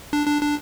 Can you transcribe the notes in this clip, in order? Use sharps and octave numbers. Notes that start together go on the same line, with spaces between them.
D4
D4
D4